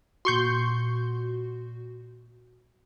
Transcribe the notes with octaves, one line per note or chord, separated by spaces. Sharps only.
A#2 F#4 C6 C#6 G6